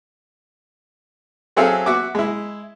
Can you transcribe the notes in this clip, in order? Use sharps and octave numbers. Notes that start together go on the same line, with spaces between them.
F#3 C4 G#4 A4 E5 F5
F#4 E5 F#5 D6
G#3 E4